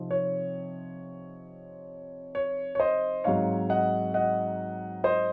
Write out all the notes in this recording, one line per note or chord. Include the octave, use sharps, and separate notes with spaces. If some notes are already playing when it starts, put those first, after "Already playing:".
Already playing: C3 F3 C4 D#4
C#5
C#5
C#5
C5 D#5
G#2 F#3 C4 D#4 C#5 F5
D#5 F#5
D#5 F#5
C5 D#5